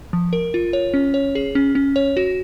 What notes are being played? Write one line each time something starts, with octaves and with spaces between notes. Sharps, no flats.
F3
A#4
F4
C#5
C#4
C#5
G#4
C#4
C#4
C#5
F#4